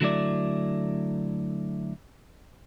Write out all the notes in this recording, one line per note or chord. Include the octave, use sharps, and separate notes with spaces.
D3 F#3 A3 E4 D5